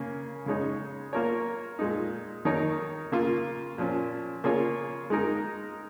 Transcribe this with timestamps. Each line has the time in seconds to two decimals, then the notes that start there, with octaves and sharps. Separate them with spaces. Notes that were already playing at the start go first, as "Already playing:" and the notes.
Already playing: C#3 A#3 C#4
0.46 C#3 G#3 D#4 C#5
1.13 A#3 F4 A#4 C#5
1.79 A#2 G#3 D#4
2.45 D#3 A#3 D#4 A#4 C#5
3.12 C#3 A#3 F4
3.78 A#2 F3 C#4
4.44 C#3 A#3 F4 G#4 C#5
5.10 G#3 D#4 A#4